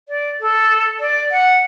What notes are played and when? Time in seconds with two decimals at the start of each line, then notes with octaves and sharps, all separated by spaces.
0.09 D5
0.40 A4
1.00 D5
1.31 F#5